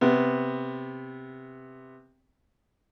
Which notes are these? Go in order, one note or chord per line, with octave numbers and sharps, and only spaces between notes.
C3 B3